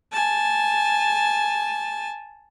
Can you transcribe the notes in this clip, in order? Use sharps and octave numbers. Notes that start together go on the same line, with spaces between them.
G#5 A5